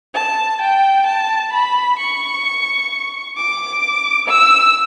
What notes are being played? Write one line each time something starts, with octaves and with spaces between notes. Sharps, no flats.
A5
G5
A5
B5
C#6
D6
E6